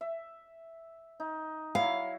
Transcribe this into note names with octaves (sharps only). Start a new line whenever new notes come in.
E5
D#4
F#3 E4 F5